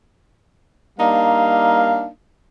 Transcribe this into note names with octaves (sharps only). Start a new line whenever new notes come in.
G3 A#3 D4 D#4 F5